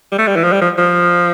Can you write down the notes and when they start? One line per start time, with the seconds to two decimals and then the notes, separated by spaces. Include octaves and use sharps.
0.12 G3
0.18 A3
0.27 G3
0.36 E3
0.44 F3
0.53 G3
0.61 F3
0.78 F3